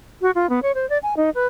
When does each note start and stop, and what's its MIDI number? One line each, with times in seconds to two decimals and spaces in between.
0.22 0.31 66
0.35 0.49 65
0.50 0.60 59
0.63 0.72 73
0.75 0.88 72
0.90 0.98 74
1.03 1.14 80
1.17 1.30 63
1.35 1.47 71